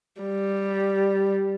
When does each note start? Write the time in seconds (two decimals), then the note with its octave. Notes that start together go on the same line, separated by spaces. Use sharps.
0.22 G3